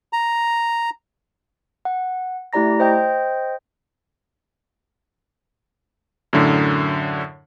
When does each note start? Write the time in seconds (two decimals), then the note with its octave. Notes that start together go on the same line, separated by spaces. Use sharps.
0.13 A#5
1.85 F#5
2.53 A3 E4 G4 D5 A#5 A#6
2.80 C5 D#5 G5 G6
6.33 F#2 A2 D3